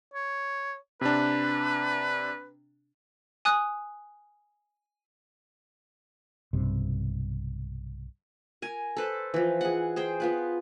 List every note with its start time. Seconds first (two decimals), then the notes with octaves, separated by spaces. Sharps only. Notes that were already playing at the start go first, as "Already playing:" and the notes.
0.14 C#5
1.01 C3 D4 B4
3.45 G#5 D#6 F#6
6.53 B1 G2 C3
8.62 A#4 G#5
8.97 A4 B4 C5
9.34 E3 F3
9.61 G#4 F#5
9.96 G#4 C5 G5
10.20 B3 F4 B4